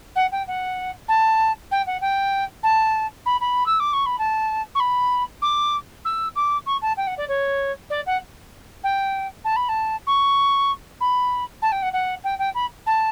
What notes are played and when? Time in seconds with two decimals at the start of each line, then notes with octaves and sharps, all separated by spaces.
0.15 F#5
0.31 G5
0.47 F#5
1.08 A5
1.71 G5
1.86 F#5
2.01 G5
2.63 A5
3.25 B5
3.40 B5
3.66 E6
3.79 D6
3.93 C#6
4.06 B5
4.18 A5
4.75 C#6
4.79 B5
5.42 D6
6.05 E6
6.35 D6
6.66 C#6
6.81 A5
6.97 G5
7.07 F#5
7.17 D5
7.28 C#5
7.90 D5
8.06 F#5
8.83 G5
9.44 A5
9.56 B5
9.68 A5
10.06 C#6
11.00 B5
11.62 A5
11.72 G5
11.82 F#5
11.93 F#5
12.23 G5
12.38 G5
12.54 B5
12.86 A5